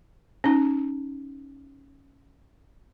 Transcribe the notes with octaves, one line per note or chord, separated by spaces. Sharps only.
C#4 D#4